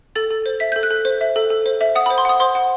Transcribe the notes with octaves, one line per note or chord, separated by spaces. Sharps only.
A4 A6
A4
C5
E5 B6
G6
A4
F#6
A4
C5
E5
A4
A4
C5
E5
F#5 D#6
B5
C5
C6
F#5 D#6
C5 C6
F#5